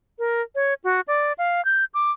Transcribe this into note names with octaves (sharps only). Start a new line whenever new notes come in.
A#4
C#5
F#4
D5
F5
G6
D6